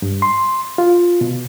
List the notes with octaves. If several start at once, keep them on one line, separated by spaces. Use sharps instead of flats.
G2
C6
F4
B2